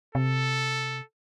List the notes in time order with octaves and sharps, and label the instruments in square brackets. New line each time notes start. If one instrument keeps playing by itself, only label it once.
[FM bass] C3 [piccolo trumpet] A4